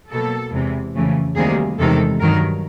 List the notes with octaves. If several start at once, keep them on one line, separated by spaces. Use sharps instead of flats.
B2 F#3 A#3 A4
E2 C3 E3 G#3
F2 C#3 E3 A3
D2 C3 D#3 G3 A#3 G#4
E2 C3 D#3 G#3 A4
G2 D#3 F#3 A#4